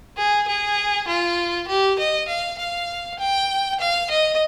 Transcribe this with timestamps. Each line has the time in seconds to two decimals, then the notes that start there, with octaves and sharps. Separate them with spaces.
0.17 G#4
0.48 G#4
1.08 F4
1.68 G4
1.99 D#5
2.28 F5
2.59 F5
3.19 G5
3.80 F5
4.10 D#5